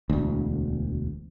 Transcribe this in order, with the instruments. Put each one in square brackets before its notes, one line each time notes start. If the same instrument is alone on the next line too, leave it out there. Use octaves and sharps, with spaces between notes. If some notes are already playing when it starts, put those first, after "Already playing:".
[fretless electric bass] E1 D2